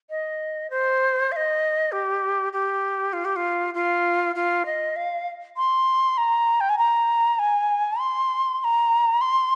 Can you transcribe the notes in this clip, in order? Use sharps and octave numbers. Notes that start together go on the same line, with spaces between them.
D#5
C5
F5
D#5
G4
G4
F4
G4
F4
F4
F4
D#5
F5
C6
A#5
G5
G#5
A#5
G#5
C6
C6
A#5
C6